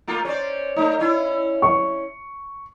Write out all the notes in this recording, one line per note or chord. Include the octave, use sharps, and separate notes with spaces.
A3 A#3 F4
C#4 C5 D5
A3 D#4
C#4 E4
C#6